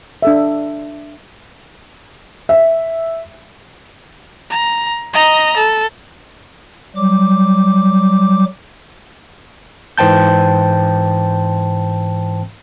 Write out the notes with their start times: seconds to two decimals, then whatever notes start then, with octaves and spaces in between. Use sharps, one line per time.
0.22 D4 A4 E5
2.49 E5
4.50 A#5
5.13 D#5 A#5
5.57 A4
6.96 F#3 G3 D6
9.98 G#2 E3 C5 G5 A5 G6